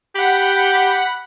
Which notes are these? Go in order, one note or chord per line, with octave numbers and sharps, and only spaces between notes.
G4 F#5 B5